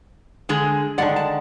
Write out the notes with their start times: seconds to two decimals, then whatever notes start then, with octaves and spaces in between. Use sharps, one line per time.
0.49 D3 G#3 G#4
0.98 D3 D#3 G#3 D5 F#5
1.16 A5